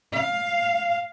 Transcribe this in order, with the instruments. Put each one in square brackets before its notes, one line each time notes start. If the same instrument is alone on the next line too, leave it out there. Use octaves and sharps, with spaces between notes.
[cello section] F5